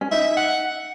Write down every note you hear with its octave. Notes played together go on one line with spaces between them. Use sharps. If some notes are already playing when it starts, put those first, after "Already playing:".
C#4
D#4 E5
F#5